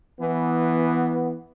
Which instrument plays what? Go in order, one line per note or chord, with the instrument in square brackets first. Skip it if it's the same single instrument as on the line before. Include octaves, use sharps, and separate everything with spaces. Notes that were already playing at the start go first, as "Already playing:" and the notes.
[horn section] E3 B3